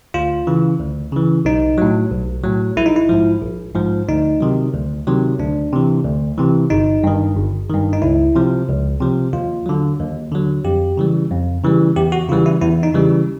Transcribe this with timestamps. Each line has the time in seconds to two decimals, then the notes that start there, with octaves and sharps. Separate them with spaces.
0.14 D2 F4
0.47 C#3 E3
0.80 D2
1.13 C#3 E3
1.45 B1 D#4
1.78 A2 F#3
2.12 B1
2.44 A2 F#3
2.77 A#1 E4
2.86 D#4
2.96 E4
3.09 G#2 F3
3.42 A#1
3.75 G#2 F3
4.08 D2 D#4
4.40 C3 D#3 F#3
4.74 D2
5.07 C3 D#3 F#3
5.39 D2 D4
5.73 C3 E3
6.05 D2
6.38 C3 E3
6.70 G1 D#4
7.04 G2 D#3
7.37 G1
7.70 G2 D#3
7.93 D#4
8.02 C#2 E4
8.35 C3 F3
8.68 C#2
9.01 C3 F3
9.33 D#2 F4
9.66 D3 F#3
9.99 D#2
10.32 D3 F#3
10.65 F2 G4
10.97 C#3 E3 G3
11.31 F2
11.64 C#3 E3 G3
11.96 E2 G4
12.12 F#4
12.29 C#3 E3 G3 F4
12.46 E4
12.62 E2 E4
12.83 D#4
12.94 C#3 E3 G3